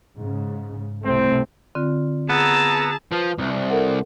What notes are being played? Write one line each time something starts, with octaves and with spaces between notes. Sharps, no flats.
G#2 C#3
C2 C3 A3 C4
D3 C4 F4
B3 G#4 A5 A#5 E6 G6
F3 B4
C2
A4 A#4 F#5